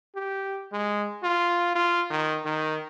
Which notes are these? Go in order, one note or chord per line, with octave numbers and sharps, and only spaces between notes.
G4
G#3
F4
F4
D#3
D#3